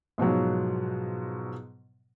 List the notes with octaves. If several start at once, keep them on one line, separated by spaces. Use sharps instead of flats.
G#2 B2 F3 F#3